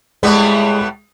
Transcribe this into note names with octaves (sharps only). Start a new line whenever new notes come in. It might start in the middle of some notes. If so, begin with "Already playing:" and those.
A2 G3 G#3 B3